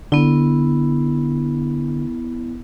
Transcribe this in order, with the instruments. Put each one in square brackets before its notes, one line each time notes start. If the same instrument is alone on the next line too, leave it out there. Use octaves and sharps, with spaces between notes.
[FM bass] D3 [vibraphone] B3 E4